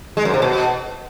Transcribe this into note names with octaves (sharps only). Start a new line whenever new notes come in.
G#3
F#2
C3
B2